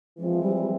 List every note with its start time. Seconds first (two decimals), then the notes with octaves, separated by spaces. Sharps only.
0.18 E3 F3 G#3 C4 E4
0.43 G3
0.56 G3